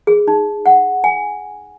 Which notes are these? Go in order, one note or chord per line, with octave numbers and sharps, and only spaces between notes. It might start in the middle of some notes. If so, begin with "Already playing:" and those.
G#4
D#4
F#5
G#5